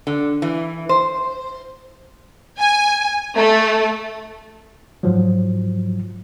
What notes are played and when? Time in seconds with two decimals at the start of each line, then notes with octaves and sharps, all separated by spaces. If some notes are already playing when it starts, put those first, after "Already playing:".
0.07 D3
0.42 E3
0.89 C5
2.58 G#5
3.36 A3
5.03 G#2 F3 F#3